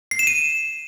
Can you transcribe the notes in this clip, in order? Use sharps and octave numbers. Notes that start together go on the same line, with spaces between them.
C7
E7
D#7